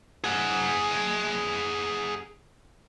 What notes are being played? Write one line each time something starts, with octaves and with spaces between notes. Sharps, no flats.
G#4 F#5